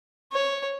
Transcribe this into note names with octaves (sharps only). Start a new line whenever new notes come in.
C#5